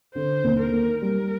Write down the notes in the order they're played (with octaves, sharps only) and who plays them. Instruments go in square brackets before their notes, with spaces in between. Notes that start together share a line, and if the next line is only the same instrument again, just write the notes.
[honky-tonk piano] D3 [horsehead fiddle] C5
[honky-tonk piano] D#2
[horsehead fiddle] A#4
[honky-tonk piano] A#3
[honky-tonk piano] G3 [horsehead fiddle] A#4